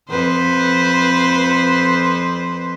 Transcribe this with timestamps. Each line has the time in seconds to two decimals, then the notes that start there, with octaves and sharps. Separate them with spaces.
0.10 F2 B4 C5